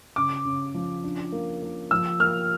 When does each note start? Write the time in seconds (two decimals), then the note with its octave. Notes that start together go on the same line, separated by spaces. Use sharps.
0.16 C#3 D6
0.45 C#3
0.74 F3
1.04 D4
1.32 A#3
1.63 A#3
1.91 F3 E6
2.20 A#3 F6